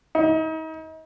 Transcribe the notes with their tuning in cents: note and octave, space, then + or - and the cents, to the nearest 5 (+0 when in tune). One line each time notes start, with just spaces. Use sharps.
D#4 +40